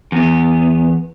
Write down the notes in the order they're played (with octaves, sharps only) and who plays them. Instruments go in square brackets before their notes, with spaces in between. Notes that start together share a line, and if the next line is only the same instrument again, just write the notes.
[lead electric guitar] E2 B3